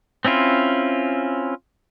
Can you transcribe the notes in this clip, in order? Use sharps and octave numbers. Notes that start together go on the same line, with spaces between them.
C4 C#4 E4 F4